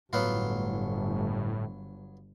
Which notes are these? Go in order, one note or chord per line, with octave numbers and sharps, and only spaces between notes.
G1 A2 F#3 B3 F4